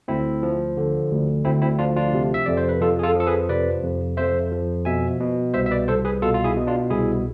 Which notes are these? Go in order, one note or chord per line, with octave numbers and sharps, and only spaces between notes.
D2 C4 E4
F3
D3
D2
D2 C4 E4
C4 E4
F3 D4 F4
D4 F4
C3
E5
F2 D5
C5
B4
F2 F4 A4
G#4
F4 A4
F3
A4
G#4 B4
C3 B4 D5
F2
F2 C5 E5
F3
B2 E5 G#5
B2
C2 C5 E5
E5
B4 D5
C2 A4 C5
G#4 B4
B2 F4 A4
F4
E4 G#4
B2
D4 F4
C2 E4 G#4